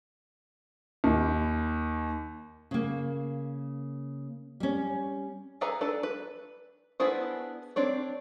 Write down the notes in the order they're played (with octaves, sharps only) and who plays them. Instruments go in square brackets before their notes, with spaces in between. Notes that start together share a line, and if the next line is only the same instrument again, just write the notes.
[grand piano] D#2
[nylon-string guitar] C#3 A#3
G3 C#4
[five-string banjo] G#4 A4 B4 G#5 A#5
D4 A4 B4
B4
B3 D4 E4 G#4 C5
C4 D4 C#5